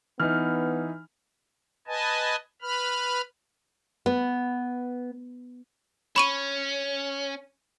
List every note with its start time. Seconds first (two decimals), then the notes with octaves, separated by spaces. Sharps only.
0.20 E3 B3 D#4 F6
1.87 B4 D#5 G#5 A5
2.62 B4 B5 F6
4.06 B3
6.16 C#4 B5 C#6 D#7